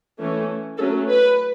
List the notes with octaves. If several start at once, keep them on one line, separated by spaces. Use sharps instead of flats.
E3 A3 C#4
F#3 A3 C#4 A4
B4